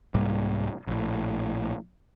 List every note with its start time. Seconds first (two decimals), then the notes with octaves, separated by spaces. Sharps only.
0.14 C2 G#2 G3 A#3
0.87 A#1 A2